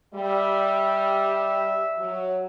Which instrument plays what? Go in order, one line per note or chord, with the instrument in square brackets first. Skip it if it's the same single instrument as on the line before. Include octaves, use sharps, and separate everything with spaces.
[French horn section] G3 [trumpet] E5
[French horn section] F#3